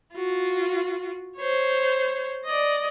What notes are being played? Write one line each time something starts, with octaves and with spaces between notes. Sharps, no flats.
F4 F#4
C5 C#5
D5 D#5